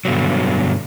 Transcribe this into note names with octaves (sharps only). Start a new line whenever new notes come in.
G2 B2 D3 F#3